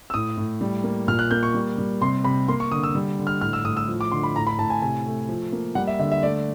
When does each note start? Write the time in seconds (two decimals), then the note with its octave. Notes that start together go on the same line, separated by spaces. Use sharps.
0.10 E6
0.14 A2 D#6
0.37 A2
0.61 G3
0.84 A#3
1.08 A#2 F6
1.19 F#6
1.31 A#3 G6
1.43 C#6
1.54 G3
1.78 G3
2.01 C3 C6
2.24 C3 B5
2.48 A#3 C6
2.60 C#6
2.72 D3 D#6
2.84 E6
2.95 G3
3.19 D3
3.27 F6
3.41 A2 F6
3.53 E6
3.65 A2 D#6
3.77 E6
3.88 F3
4.01 D6
4.12 D3 C6
4.23 B5
4.35 A2 A#5
4.47 B5
4.59 A2 A5
4.70 G#5
4.82 C3 G#5
5.06 A3
5.29 F3
5.52 A#3
5.75 G3 F#5
5.87 E5
5.99 D3 E5
6.12 E5
6.23 A3 D5